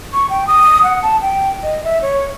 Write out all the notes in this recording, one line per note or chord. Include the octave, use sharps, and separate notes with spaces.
C#6
G5
D#6
F#5
A5
G5
D#5
E5
C#5